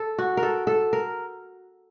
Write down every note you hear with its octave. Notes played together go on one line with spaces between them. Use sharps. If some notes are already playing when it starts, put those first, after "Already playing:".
Already playing: A4
F#4
A#4
A4
A4
A#4